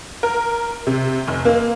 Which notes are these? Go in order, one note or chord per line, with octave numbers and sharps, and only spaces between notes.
A#4
C3
F1
A#3